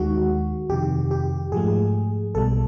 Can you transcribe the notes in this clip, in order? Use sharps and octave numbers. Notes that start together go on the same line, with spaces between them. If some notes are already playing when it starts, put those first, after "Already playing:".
Already playing: D#2 D#3 G#3 F#4
F2 C3 D#3 G4
G4
G#2 F3 A3 G#4
B1 B2 G3 A4